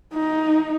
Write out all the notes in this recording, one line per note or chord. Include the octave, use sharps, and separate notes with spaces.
D#4